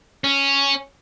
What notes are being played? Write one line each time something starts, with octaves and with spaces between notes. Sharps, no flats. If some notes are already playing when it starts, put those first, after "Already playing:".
C#4